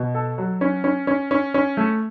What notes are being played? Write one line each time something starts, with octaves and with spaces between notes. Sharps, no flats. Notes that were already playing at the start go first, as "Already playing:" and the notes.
Already playing: B2
A4
F#3
C#4
C#4
C#4
C#4
C#4
A3